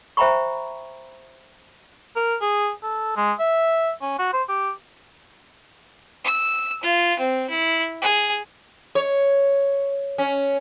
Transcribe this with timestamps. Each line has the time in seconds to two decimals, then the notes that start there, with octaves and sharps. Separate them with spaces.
0.17 C5 E5 G5 A#5 B5 C#6
2.16 A#4
2.41 G#4
2.83 A4
3.16 G#3
3.39 E5
4.02 C#4
4.19 F#4
4.33 C5
4.49 G4
6.24 E6
6.83 F4
7.19 C4
7.49 E4
8.02 G#4
8.95 C#5
10.18 C#4